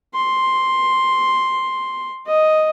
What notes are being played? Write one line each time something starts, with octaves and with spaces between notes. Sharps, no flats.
C6
D#5